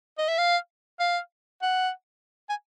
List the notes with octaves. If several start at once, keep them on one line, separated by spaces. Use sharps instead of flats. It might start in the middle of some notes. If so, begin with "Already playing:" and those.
D#5
E5
F5
F5
F#5
G#5